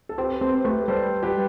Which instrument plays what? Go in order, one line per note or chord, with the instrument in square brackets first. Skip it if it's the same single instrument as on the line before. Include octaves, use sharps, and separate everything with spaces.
[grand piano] A4
[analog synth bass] C4 [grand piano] G4 B4
[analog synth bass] C4 [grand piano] A4 C5
[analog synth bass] A3 [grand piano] G4 B4
[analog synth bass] G3 [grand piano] A4 C5
[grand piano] G4 B4